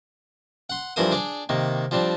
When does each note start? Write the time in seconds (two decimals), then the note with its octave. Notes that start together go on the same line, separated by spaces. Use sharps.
0.70 F#5 C6
0.96 G2 E3 F3 A#4 C5 D#6
1.11 D4 G#4 D5
1.49 C3 D#3 A#3
1.91 F3 G3 C4 D4